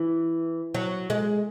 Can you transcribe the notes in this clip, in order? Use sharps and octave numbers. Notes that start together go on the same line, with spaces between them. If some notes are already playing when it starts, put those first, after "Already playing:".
Already playing: E3
F#3
G#3